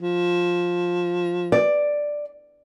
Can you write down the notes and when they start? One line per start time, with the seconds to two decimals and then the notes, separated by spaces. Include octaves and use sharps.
0.01 F3
1.52 D5